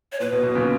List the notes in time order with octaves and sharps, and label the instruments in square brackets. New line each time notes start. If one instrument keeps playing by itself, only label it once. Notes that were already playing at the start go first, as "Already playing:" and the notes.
[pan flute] C#5
[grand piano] A#2 [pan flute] B4
[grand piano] B2
B2
A#2 C#3